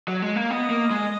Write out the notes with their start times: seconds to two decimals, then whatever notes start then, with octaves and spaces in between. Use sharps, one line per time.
0.08 F#3
0.22 G#3
0.36 A#3
0.50 B3 D#5
0.70 A#3
0.91 G#3